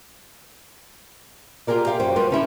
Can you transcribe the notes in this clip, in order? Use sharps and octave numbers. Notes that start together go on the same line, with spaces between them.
F4 G4 G#4 A#4 D5
G4 F5 G5
F#2 C5 G5
G3 F4 A#4 B4
D3 C#4 E4 G4